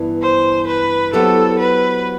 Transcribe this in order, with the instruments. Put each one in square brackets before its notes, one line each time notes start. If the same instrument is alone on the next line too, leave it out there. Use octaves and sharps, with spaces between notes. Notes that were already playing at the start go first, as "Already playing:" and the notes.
Already playing: [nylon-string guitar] G2 E3 B3
[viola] C5
B4
[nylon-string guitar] F#3 B3 E4 G4 C5 [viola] A4
[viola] B4